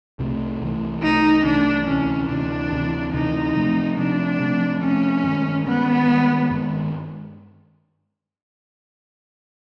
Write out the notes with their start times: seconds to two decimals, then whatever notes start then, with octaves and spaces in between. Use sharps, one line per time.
0.19 C2 C3 E3 A3
0.61 C2 C3 E3 A3
1.02 C2 C3 E3 A3 D#4
1.44 C2 C3 E3 A3 D4
1.87 D2 C3 E3 C#4
2.29 D2 C3 E3 D4
2.72 D2 C3 E3
3.14 D2 C3 E3 D#4
3.55 C3 F3 A3 C4
3.97 C3 F3 A3 C4 D4
4.40 C3 F3 A3 C4
4.82 C3 F3 A3 C4 C#4
5.24 G2 D#3 G#3
5.66 G2 D#3 G#3 B3
6.08 G2 D#3 G#3
6.51 G2 D#3 G#3